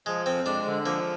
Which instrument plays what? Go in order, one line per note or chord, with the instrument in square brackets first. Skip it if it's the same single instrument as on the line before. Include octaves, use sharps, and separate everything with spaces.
[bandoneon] F3 [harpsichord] G#3
[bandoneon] F2 [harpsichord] C4
[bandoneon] G#3 [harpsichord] D4
[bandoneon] D3
[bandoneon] F3 [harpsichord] A#3